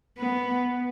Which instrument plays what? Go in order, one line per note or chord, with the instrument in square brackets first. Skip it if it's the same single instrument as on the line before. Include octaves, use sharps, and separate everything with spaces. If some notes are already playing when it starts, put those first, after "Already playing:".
[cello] B3